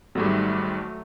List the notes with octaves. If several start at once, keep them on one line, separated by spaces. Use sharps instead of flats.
G#1 G#2 F#3 G3 A3